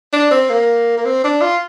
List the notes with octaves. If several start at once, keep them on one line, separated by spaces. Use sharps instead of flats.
D4
C4
A#3
A#3
C4
D4
F4